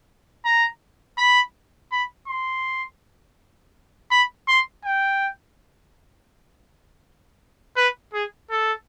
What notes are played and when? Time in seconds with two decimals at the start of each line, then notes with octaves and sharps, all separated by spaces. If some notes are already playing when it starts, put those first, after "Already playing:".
0.45 A#5
1.18 B5
1.92 B5
2.28 C6
4.11 B5
4.48 C6
4.85 G5
7.76 B4
8.13 G#4
8.50 A4